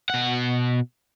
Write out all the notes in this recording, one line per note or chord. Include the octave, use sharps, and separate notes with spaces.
B2 F#5